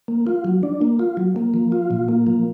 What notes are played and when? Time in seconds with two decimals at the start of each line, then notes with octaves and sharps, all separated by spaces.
0.08 A#3
0.27 F4
0.44 F#3
0.63 D4
0.81 A#3
0.99 F4
1.17 F#3
1.36 A#3
1.54 F3
1.72 F4
1.91 A#2
2.09 A#3
2.27 F3